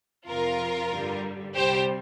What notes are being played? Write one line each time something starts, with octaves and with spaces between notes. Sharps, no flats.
F2 C3 F3 F4 A#4
G2 D3 G3
C2 C3 G3 G4 C5